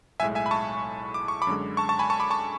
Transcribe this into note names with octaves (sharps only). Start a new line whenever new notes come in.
B1 A2 G#3 E5 G#5
E5 G#5
B5
A5 C#6
D6
C#6
B5 D6
F#2 D3 G#3
A5 C#6
A5 C#6
G#5 B5
A5 C#6
B5 D6
A5 C#6